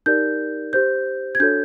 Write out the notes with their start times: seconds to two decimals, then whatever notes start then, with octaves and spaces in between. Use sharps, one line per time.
0.06 D#4 G4 A#4 D5 G6
0.73 G4 C5 G6
1.35 G#6
1.40 D4 F#4 A4 C#5 G6